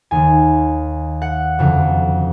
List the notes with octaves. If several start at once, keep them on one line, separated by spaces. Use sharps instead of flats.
D#2 D#3 G#5
F#5
F#1 F2 D3